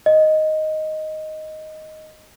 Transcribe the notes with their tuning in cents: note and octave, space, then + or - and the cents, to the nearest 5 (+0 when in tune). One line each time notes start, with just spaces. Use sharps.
D#5 +0